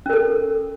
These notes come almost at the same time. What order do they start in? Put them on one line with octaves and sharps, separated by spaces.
C#4 A#4 A4